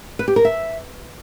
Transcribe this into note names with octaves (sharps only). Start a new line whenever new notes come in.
B4
G4
A#4
E5